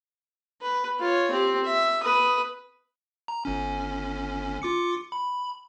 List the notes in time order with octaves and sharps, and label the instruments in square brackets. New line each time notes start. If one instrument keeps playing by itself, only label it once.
[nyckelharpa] B4
F4 C#5
C4 G4
E5
B4 D#6
[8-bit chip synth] A#5
G1 C#4
F4 D6 C#7
B5